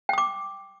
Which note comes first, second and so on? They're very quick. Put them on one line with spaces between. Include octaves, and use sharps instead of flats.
G5 D#6 D6